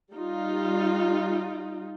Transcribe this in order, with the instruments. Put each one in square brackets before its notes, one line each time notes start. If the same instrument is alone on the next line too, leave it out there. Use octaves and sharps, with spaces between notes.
[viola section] G3 D#4 F4